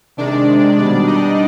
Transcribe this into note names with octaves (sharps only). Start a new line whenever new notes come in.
C3 D#3 G#3 D4 D5
B2 G3 D4 D5
D#4 D#5